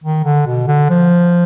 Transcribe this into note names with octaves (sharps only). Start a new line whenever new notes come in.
D#3
D3
B2
D3
F3